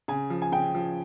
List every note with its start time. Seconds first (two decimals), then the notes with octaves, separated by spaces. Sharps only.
0.08 C#3 G#5
0.30 F3
0.42 G#5
0.52 C#3 G5
0.75 F3